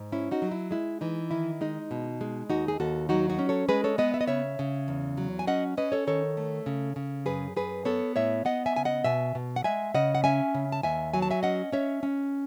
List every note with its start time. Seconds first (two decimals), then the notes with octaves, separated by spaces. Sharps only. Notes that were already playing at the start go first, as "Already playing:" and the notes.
Already playing: G#2
0.12 C#4 E4
0.31 D#4 F#4
0.42 F#3
0.52 E4
0.71 G#3 E4
1.01 E3 D#4
1.31 D#3 E4
1.61 G#3 D#4
1.91 B2
2.21 G#3
2.49 D#2 D#4 F#4
2.68 G#4
2.80 D#2 F#4 A4
3.09 F#3 D#4 F#4
3.29 D#4 F#4
3.39 C#4
3.49 A4 C#5
3.68 G#3 G#4 B4
3.84 A4 C#5
3.98 B3 B4 D#5
4.14 E5
4.21 D#5
4.27 C#3 C#5 E5
4.59 C#3
4.88 E2
5.17 F#3
5.39 G#5
5.47 C#4 D#5 F#5
5.77 C#4 B4 D#5
5.92 A4 C#5
6.07 D#3 A4 C#5
6.37 A3
6.66 C#3
6.96 C#3
7.26 F#2 G#4 B4
7.56 F#2 G#4 B4
7.85 B3 A4 C#5
8.16 A2 C#5 E5
8.45 B3 D#5 F#5
8.66 E5 G#5
8.76 C#3 G#5
8.85 D#5 F#5
9.04 B2 E5 G#5
9.35 B2
9.56 F#5
9.64 G#3 E5 G#5
9.94 C#3 D#5 F#5
10.15 F#5
10.24 C#4 E5 G#5
10.54 C#3
10.72 A5
10.83 D#2 E5 G#5
11.14 F#3 G#5
11.22 A5
11.31 E5 G#5
11.43 C#4 D#5 F#5
11.72 C#4 C#5 E5
12.03 C#4